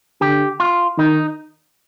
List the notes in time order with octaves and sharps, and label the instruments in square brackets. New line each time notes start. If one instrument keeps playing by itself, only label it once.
[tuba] D3 [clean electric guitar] G4
[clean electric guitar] F4
[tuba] D#3 [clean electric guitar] D#4